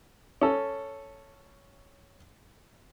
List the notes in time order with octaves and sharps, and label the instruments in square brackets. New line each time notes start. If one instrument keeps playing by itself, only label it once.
[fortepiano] C#4 A4